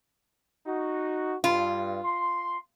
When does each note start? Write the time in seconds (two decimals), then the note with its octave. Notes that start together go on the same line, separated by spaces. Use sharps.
0.66 D#4 F#4
1.44 G2 F4
2.04 C6